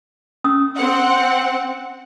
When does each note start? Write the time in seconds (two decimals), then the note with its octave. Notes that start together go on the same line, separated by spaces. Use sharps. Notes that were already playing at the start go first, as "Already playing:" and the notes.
0.44 C#4 D#6 E6
0.76 C4 F#5